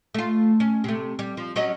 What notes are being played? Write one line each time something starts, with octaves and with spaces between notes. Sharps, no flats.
A3 F4
C#4
C3 A3
G3
F3
F#3 C#4 D#5